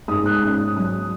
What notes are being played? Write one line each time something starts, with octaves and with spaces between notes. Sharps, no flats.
G#2 D#6
F#6
C#4 D#6
F#3 D#6